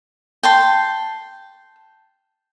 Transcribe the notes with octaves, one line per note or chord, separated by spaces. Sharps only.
G5 A5 C6